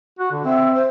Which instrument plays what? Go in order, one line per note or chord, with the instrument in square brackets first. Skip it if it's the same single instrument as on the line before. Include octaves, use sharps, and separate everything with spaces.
[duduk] F#4
D3
[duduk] C4 [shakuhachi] E5
[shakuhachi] C5